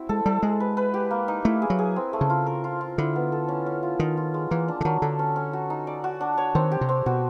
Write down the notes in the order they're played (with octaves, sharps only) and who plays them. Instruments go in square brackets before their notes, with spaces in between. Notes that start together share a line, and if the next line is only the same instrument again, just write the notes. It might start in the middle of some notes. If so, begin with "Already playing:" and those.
Already playing: [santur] C4 E4 F#4
[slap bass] G#3 [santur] A4
[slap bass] G3 [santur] A4
[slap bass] G#3 [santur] G#4
[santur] B4
B4
G4
A#3
D#4
[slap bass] A3 [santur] E4
[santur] G#4
[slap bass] F#3
[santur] G#4
C4
A3
[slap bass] C#3
[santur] F4
A#4
F4
F4
[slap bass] D3 [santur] E4
[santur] B3
A4
C#4
C#4
F4
[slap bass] D#3 [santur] F4
[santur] F4
G#3
[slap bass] E3 [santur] A#3
[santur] D4
[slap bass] D3
[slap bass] D#3 [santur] F#3
[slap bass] D3 [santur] A4
[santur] C#4
C#4
F#4
D#4
D5
F#4
D4
C#5
[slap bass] D#3 [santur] C4
[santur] G4
[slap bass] C3
[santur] C4
[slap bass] B2 [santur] F#4